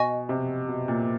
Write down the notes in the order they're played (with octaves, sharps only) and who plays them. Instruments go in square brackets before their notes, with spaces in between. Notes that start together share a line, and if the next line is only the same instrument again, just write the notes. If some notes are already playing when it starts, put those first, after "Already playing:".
Already playing: [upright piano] B2 [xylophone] D#5 G#5 C#6
[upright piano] C3
B2
A#2